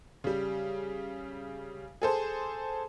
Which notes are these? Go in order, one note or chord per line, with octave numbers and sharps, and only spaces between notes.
C#3 G3
G#4 A4 C5